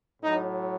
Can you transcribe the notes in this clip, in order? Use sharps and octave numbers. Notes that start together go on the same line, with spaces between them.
A2 F#3 D#4